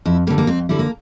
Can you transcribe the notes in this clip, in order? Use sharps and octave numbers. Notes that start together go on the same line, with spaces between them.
F2 E4
D3 G3 A#3
A#3
F2 C4
D3 G3 E4
A#3